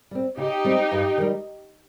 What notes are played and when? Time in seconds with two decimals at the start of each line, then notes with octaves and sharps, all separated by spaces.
0.11 G3 C4
0.37 C#3 D#4 G4
0.64 G3 C4
0.91 G2
1.18 D#3 G3